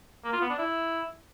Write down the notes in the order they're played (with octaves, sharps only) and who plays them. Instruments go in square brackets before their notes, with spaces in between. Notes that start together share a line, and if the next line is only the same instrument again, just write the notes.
[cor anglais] A#3
F4
B3
D4
E4